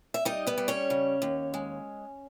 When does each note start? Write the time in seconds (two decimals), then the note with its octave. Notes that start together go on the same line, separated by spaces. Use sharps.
0.14 E5
0.25 G3 D#4 D#5
0.47 B3 B4
0.58 G3
0.68 C#4 C#5
0.90 C#3
1.22 D#2
1.54 G#3